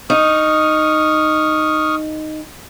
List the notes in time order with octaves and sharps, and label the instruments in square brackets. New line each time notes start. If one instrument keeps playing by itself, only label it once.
[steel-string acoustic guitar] D#4 [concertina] C#6 D#6 F6